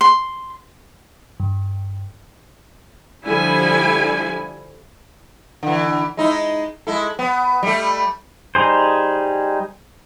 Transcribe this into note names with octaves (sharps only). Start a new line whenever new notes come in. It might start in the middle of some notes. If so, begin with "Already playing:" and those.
C6
G2
D3 F3 G3 E4 G#5
D3 E3
G#3 D#4 E4
G#3 E4 A4
B3
G3 A3
G3 D#4 G#4 C5